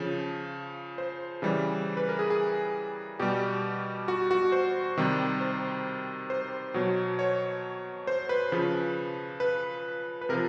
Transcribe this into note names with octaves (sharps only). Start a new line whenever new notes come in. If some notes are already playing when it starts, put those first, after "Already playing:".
Already playing: C#3 F3
C5
C#3 E3 G3
B4
A#4
G#4
G#4
B2 G3 G4
F#4
F#4
C5
C3 D#3 G3
C5
C5
B2 F#3
C#5
C5
B4
C#3 F3
B4
B4
C3 F3 A#4